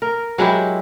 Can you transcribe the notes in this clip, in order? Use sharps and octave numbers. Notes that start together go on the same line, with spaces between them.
A#4
F#3 G#3 E4 G4